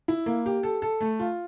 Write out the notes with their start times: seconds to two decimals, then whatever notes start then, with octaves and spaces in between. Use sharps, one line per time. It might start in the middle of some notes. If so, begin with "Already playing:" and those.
0.08 E4
0.26 A#3
0.46 G4
0.63 A4
0.82 A4
1.01 A3
1.20 F4